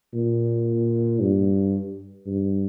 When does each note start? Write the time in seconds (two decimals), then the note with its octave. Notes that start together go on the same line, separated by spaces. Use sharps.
0.14 A#2
1.21 G2
2.26 G2